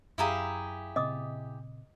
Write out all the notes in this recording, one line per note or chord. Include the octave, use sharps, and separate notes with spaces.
F#2 E4 G4 G#4 F5 A#5 E6
A#2 C#3 C4 D#5 D6 D#6